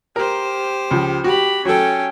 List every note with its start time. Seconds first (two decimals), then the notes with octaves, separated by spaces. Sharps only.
0.16 G4 A#4 C5
0.91 C#2 F3
1.24 F#4 G4 B5
1.65 F#3 C#4 A4 G5